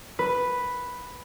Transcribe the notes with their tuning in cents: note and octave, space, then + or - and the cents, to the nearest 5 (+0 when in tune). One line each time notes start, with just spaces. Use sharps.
B4 +0